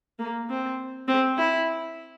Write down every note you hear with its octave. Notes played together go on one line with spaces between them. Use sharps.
A#3
C4
C4
E4